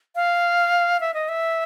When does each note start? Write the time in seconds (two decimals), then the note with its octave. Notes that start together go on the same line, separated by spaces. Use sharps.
0.16 F5
1.00 E5
1.14 D#5
1.29 E5